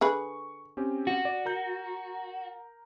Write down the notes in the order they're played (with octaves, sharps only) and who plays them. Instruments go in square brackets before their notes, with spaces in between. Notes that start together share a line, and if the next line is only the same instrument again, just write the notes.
[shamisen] D3 G#4 B4 [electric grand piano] C#6
[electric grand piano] C4 C#4 G4
[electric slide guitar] F#4
[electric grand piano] D5
A#4 A#5 G6